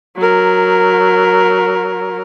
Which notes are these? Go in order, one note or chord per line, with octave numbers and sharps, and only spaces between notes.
F#3 A#4